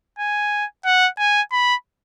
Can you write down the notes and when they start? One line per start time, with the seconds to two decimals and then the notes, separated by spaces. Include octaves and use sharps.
0.19 G#5
0.85 F#5
1.18 G#5
1.52 B5